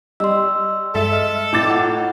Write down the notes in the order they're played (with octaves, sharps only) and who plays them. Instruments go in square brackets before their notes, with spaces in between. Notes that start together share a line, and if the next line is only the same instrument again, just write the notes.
[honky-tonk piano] G3 [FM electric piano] D#5 [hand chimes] C6 E6
[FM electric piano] G2 G#3 [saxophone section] A4 [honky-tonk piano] E5
[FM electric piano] D#5 F6
[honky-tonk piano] A2 D6 A6
[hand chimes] E4 F4 F#5